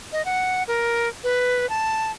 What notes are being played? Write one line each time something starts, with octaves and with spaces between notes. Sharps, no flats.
D#5
F#5
A#4
B4
A5